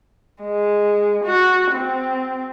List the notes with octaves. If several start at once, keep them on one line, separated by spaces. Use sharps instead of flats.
G#3
F#4
C4